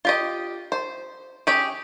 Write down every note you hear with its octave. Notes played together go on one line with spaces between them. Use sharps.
F4 G4 D#5
C5
C#4 G4 G#4